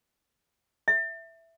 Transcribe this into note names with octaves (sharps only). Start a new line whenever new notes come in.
E5